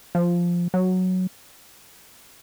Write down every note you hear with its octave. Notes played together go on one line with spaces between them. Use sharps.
F3
F#3